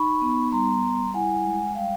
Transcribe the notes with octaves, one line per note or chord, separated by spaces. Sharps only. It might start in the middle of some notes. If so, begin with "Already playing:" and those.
Already playing: D#4 B5 C#6
B3
G3 A#5 C6
G3
E4 F#5 G#5
G#3
G3 F5 G5